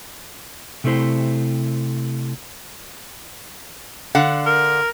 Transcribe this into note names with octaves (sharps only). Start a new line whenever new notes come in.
C3 A3 C4 E4 C5
D3 F5 F#5
A#4